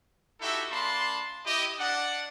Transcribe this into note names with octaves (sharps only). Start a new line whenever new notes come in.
D#4 E4 F#4 G4 A4 E5
A#3 D4 A5 B5 C6
E4 G4 D#5
D4 D5 F#5